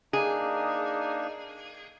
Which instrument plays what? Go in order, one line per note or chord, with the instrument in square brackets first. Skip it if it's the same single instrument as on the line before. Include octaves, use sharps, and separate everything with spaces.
[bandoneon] A#3 D4 D#4 [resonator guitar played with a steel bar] G#4